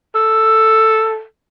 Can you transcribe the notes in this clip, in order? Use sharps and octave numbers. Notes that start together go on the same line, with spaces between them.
A4